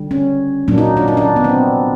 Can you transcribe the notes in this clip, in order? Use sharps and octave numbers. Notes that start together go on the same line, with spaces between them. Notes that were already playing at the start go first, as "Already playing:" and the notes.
Already playing: D3 G3
C#4
A#2 F#3 A#3 D4
D#4
D4
D#4
D4
B3
C4